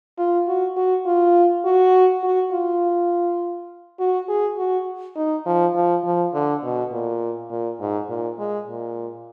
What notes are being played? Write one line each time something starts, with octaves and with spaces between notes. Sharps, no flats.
F4
F#4
F#4
F4
F#4
F#4
F4
F#4
G#4
F#4
D#4
F3
F3
F3
D3
B2
A#2
A#2
G#2
A#2
G#3
A#2